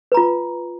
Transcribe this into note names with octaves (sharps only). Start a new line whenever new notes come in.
F4 B4 A#5